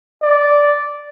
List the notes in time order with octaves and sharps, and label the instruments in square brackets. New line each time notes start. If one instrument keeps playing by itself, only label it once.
[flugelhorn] D5